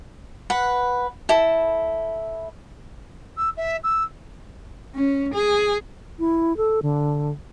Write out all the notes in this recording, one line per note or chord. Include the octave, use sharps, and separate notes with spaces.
B4 F#5
E4 A4
E6
E5
E6
C#4
G#4
E4
A4
D3